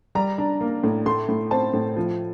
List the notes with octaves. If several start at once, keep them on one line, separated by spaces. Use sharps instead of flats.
G3 A#5
D4
A#3
A2
A3 C6
A2
C4 A5
A2
F3